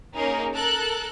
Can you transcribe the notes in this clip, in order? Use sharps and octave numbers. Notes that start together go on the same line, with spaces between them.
A#3 C#4 D#4 G#4 A#4
A4 A#4 F#6